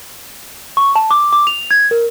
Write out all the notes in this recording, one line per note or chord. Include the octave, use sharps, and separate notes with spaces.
C#6
A5
D6
D6
F7
G#6
A#4